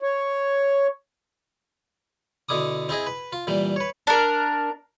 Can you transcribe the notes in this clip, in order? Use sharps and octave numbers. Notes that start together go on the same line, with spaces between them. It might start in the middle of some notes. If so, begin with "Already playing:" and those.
C#5
B2 D3 E4 D6 D#6
C4 E4 G#4 D#5
B4
F4
A#2 E3 G3
B4 C#5
D4 A#4